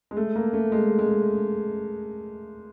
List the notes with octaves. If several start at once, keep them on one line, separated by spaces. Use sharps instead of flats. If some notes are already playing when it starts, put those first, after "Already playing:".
G#3
A3
A#3
A3
G#3
G#3